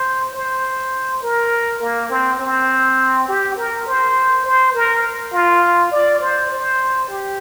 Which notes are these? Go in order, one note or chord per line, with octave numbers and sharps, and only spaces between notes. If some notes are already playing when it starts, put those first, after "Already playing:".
Already playing: C5
C5
A#4
A#3
C4
C4
G4
A#4
C5
C5
A#4
F4
D5
C5
C5
G4